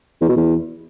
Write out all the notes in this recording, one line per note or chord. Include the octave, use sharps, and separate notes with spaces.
E2
B2
E2